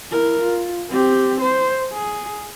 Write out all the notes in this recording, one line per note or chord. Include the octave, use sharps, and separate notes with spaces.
E4 A#4
F4
C4 G4
C5
G#4